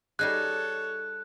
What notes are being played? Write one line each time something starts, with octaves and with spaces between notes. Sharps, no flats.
G3 D#4 G#4 A4 C#5 F#6